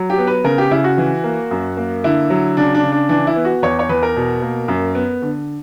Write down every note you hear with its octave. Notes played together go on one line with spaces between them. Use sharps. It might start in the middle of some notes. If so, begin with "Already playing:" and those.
Already playing: F#3
G4
B3
B4
C#3 A#4
G4
C#3 E4
F#4
E3
A#3
F#2
A#3
D3 E4
F#3
C#3 D4
D4
C#3
D4
E3 D4
E4
B3
F#4
E2 C#5
C#5
E2 B4
A#4
B2
A#3
F#2
B3
D3